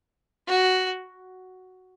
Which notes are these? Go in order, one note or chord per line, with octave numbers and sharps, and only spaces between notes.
F#4